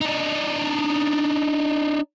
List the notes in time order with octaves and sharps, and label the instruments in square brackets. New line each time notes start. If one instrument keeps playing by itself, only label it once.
[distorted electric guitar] D4 D#4